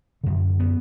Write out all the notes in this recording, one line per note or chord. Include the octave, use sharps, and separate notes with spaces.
F#2 D3
B3